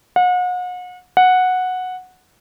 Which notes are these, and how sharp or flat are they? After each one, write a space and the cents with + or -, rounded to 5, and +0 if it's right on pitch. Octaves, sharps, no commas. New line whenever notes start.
F#5 -40
F#5 -10